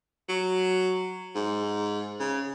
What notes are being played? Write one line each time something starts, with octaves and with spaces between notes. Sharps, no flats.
F#3
G#2
C#3